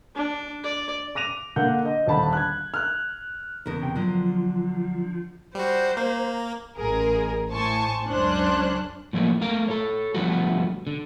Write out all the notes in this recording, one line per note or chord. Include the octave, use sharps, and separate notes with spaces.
D4
D5
D6 A#6 D#7 F7
D3 A#3 D4 F#5 G6
D#5
D#1 D3 A5 B5
F#6 G#6
F6 F#6
E2 C#3 A#4
C3 G5
D3 F3 F#3
G3 F#4 C5
A#3 A#5
A1 G#4 A#4
A2 C5 G#5 A5 C#6
C#2 F#2 C#4 D4 C5 F#6
A2 F3 A3 A#3
A3 A#4 F5
A4 C#5
D3 F3 G3 A3 B3 F#4
D3